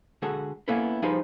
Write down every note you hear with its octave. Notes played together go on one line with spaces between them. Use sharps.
D3 G#3 F#4 G#4 A4
A#3 B3 C#4 E4 A4 B4
F3 G3 D#4 G#4 B4 C5